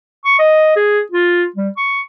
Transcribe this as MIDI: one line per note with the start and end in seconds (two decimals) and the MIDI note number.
0.25 0.35 85
0.39 0.72 75
0.76 1.01 68
1.12 1.46 65
1.56 1.69 55
1.77 2.01 85